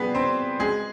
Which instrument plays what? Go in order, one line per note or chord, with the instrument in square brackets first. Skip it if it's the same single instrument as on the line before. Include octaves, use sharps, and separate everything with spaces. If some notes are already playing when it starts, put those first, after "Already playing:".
Already playing: [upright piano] G3 B3 G#4 B4
C4 C5
G#3 G#4